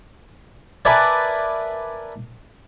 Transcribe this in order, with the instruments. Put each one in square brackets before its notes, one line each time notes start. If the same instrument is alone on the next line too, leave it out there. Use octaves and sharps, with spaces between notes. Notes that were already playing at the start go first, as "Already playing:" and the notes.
[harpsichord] A#4 B4 D5 E5 G#5 A5